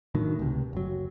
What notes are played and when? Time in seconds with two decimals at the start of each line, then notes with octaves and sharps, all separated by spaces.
0.15 A2 D3 D#3 F#3
0.39 C#2 C3
0.73 F#1 F#3